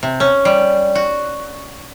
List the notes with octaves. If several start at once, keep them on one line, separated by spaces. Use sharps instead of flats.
C3
C#4
G3
F#4